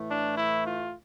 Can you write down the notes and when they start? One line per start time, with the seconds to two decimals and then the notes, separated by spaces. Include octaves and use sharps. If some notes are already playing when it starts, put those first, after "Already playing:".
Already playing: A2 E3 A3
0.09 D4
0.37 E4
0.65 F4